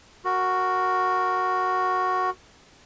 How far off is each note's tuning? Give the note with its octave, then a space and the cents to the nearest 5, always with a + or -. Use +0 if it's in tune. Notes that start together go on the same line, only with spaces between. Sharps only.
F#4 +0 A#4 +0